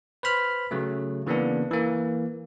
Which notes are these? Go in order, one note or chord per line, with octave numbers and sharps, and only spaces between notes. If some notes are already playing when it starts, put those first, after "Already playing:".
B4 C5 B5 F6
C#3 F#3 A3
C#3 E3 A#3 B3 D4
E3 A#3